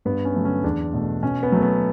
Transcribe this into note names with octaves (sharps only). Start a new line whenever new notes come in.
G2 B3
C#4
D3 F#3 A3
C#4
E2 D4
B2 A3
B2 C#4
B3
F#3 A3
B3